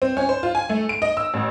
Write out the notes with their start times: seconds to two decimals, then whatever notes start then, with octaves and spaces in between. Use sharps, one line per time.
0.02 C4
0.17 C#4
0.29 C5
0.43 F4
0.55 G#5
0.69 A3
0.89 D7
1.02 D#5
1.17 E6
1.34 A1